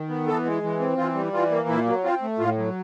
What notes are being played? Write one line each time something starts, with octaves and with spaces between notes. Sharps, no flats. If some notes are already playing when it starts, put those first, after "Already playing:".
Already playing: D#3
B3
E3 A4
G#3
E3
C4
E3 F4
G3
E3 F4
A#3
A#2 E4
F#3
C4 F4
A3
A2 F4
F#3